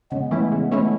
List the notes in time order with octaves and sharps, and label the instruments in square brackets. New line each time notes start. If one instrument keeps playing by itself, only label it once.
[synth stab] C#3 [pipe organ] G#3 B3
[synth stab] E3 A3 C#4 E4
C#3
E3 A3 C#4 E4